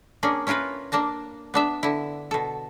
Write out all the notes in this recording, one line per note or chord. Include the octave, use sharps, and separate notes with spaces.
A#3 C#4 D4 G#4
C#4 E4 F4 A#4 B4
A#3 D4 A5 A#5
B3 D4 E5
D3 E4
B2 A4